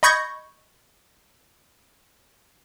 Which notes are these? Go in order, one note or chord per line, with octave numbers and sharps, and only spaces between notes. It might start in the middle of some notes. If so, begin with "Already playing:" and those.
D#5 B5 C#6 G6 G#6 A#6